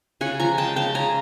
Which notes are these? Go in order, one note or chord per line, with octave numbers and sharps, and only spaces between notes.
C#3 F#5 G#5
F3 G#5 A#5
G#3 G5 A5
C#3 G5 A5
C#3 G#5 A#5